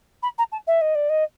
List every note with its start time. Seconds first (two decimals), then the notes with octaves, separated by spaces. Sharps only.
0.22 B5
0.38 A#5
0.52 A5
0.67 E5
0.81 D#5
0.95 D5
1.09 D#5